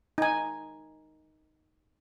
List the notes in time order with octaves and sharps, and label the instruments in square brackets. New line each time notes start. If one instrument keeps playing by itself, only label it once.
[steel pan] D#4 G#5